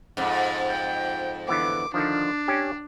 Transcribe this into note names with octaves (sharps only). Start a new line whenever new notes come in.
F2 G#2
G5
D3 E3 B3 D6
D3 D#3 F3 D4
C#4 G4